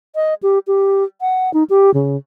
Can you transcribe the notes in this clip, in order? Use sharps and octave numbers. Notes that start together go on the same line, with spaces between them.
D#5
G4
G4
F#5
D#4
G4
C#3